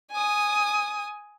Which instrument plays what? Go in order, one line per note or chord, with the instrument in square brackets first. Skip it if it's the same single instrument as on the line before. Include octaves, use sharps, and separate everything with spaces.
[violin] G#5 D#6